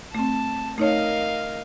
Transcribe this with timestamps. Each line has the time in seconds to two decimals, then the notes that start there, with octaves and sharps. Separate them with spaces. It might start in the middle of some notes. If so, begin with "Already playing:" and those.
0.15 A3 C4 A5
0.78 A3 D#4 A#4 C#5 D#5 F5